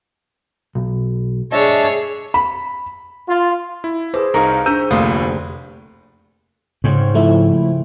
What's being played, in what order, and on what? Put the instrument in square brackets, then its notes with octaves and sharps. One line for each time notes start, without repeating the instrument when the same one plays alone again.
[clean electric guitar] B1
[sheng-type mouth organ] D4 E5 A5 [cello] G#4 C#5 [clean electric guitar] D#5
[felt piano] B5
[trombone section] F4
[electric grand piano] E4
[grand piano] G#4 C5 [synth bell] B4 [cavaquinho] D6
[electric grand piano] C2 D#4 F5 [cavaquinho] A#4 C#6
[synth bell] D4 G#4 C5 [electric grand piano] A#5 E6 D#7 [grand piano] G6
[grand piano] F1 [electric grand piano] D2 A3 A#3 [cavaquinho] F4 B4 D#6
[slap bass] G#2 [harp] C#3 C4 C#4
[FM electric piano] F3 A3 E4